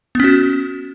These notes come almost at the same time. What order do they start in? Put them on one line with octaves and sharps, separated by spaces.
B3 C#4 F#4